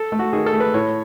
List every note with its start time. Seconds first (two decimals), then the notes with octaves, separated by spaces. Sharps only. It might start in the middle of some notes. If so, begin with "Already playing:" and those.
Already playing: A4
0.12 A3
0.19 F#4
0.33 D#3 G#4
0.46 A4
0.53 A3
0.60 B4
0.74 A2 C#5